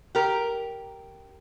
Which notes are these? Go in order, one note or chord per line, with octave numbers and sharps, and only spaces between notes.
G4 A#4